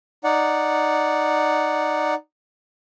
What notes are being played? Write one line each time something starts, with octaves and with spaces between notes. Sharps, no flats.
D#4 D5 F#5